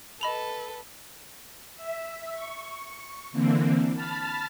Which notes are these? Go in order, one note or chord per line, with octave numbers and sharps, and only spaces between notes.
A4 B4 D#5 B5 F7
E5
C#6
D3 E3 A#3 C4
A5 B5 F6 A6